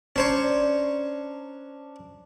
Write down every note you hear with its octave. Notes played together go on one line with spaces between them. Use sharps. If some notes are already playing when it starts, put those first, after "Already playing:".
C#4 D4 C5 C#5 A#5